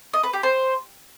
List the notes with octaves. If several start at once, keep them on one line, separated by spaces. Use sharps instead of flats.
D#5
B4
G4
C5